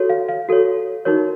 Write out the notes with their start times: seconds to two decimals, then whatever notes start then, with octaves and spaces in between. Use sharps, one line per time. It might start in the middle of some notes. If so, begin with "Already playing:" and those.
Already playing: F#4 A4 C#5
0.10 F5
0.29 F5
0.49 F#4 A4 C#5
1.05 D#4 F#4 A#4 C#5